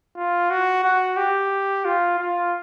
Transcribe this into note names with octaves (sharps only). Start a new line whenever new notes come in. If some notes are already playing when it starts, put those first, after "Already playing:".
F4
F#4
F#4
G4
F4
F4